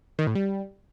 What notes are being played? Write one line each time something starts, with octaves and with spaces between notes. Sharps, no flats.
D#3
A2
G3